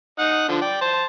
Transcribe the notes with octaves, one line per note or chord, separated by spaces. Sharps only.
D#4 F#5
D3 F3
D5 G5
C5 A5